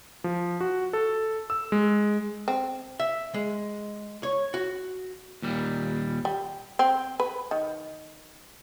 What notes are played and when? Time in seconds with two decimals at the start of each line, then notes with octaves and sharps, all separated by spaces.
0.24 F3
0.61 F#4
0.93 A4
1.50 E6
1.72 G#3
2.48 C4
3.00 E5
3.34 G#3
4.23 C#5
4.54 F#4
5.42 D#2 A#2 G3
6.25 G3
6.79 C4
7.20 B4
7.51 D#3